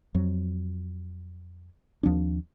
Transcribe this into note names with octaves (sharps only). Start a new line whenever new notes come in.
F2 F#3
D#2 F3 C4 D4